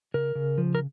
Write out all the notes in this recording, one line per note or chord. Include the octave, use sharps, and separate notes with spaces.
C#3 A#4
C#3
F3
A#4